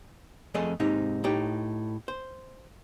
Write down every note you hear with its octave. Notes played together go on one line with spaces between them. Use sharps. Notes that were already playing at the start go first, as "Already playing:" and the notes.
F2 A3 G#4 D#5
G#2 C3 D#4
A2 D#4 G4
C5